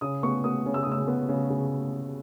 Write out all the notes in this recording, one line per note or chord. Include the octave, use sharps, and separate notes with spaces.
C#3 D#6
B3 C#6
B3 D#6
C#3
E6
D#6
C#3 E6
B3
C#3
C#3